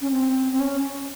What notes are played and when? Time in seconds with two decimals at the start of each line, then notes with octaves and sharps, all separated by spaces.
0.01 C#4
0.11 C4
0.52 C4
0.59 C#4